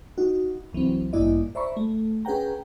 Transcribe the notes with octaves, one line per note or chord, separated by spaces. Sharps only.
D#4 F#4
C2 E3 F#3 C4
A1 G2 A#3 E4 D5 D#5
C5 D5 E5 A#5 B5 C#6
A3
C#4 G#4 B4 F#5 G5 A#5